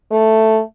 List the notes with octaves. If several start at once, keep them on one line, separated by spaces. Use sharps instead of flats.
A3